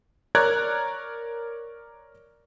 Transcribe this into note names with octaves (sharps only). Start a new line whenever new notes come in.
A#4 C#5 D5 A#5 F#6 G#6